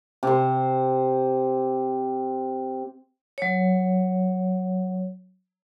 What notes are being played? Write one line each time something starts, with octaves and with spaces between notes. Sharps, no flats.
C3 C5
F#3 C#5